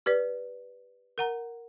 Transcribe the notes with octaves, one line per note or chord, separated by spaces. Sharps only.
G4 B4 D5
A#4 F#5 A#5